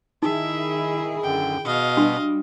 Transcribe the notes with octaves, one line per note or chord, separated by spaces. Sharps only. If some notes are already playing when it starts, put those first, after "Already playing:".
D#3 D#4 E4 G#4 E5
F#2 D3 G5
B2 D#5 F5
G3 D4 F#4